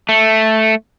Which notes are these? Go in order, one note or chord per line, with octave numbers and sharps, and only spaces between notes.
A3